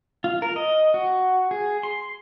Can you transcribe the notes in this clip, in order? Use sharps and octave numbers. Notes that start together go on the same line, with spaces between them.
F4
A#4
D#5
F#4
G#4
C6